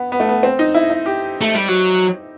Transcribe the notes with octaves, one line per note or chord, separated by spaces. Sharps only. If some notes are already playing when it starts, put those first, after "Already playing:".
Already playing: B3
B3
A3
B3
C4
D#4
E4
E4
G4
A3
G3
F#3